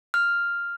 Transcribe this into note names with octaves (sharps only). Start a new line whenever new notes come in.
F6